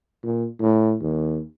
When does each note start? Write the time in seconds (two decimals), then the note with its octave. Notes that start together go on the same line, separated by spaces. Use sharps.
0.24 A#2
0.60 A2
1.01 D#2